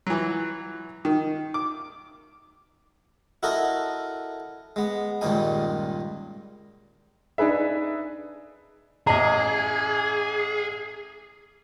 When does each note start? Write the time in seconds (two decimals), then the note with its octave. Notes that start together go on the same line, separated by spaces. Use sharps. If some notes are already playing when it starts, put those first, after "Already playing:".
0.07 E3 F#3
1.05 D#3
1.54 D6
3.43 E4 F#4 A4 A#4 D#5
4.76 G#3 B3
5.21 C#2 G2 A#2 D#3 D#4 G#5
7.38 D4 D#4 G#4 B4 E5
9.07 A1 G#4 D#5 A#5